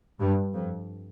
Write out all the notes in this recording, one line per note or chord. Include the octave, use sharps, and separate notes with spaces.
G2
F2